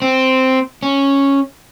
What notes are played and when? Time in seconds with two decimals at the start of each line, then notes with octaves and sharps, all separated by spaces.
0.02 C4
0.83 C#4